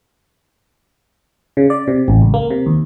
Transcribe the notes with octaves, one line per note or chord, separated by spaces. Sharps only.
C#3
D5
C3
A1
C#2
A#3
C3
D#2